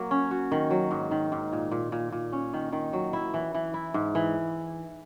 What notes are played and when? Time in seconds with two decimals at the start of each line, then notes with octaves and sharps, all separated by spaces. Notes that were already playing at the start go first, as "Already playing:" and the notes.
Already playing: F#3 A#3
0.11 C#4
0.31 F#4
0.52 D#3
0.71 F#3
0.91 G#2
1.11 D#3
1.32 G#2
1.52 A#2
1.71 A#2
1.92 A#2
2.12 A#2
2.32 C#4
2.53 D#3
2.72 D#3
2.93 F#3
3.13 E4
3.34 E3
3.54 E3
3.74 E4
3.94 G#2
4.15 E3